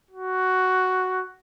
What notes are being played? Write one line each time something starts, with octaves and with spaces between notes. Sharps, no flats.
F#4